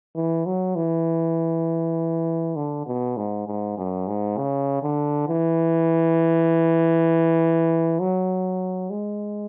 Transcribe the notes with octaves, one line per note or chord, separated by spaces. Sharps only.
E3
F#3
E3
D3
B2
G#2
G#2
F#2
G#2
C#3
D3
E3
F#3
G#3